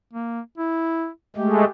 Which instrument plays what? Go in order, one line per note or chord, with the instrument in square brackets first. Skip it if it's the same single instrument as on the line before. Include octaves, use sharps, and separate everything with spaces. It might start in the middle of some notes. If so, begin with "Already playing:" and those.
[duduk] A#3
E4
[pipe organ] G#3 A3 [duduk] G4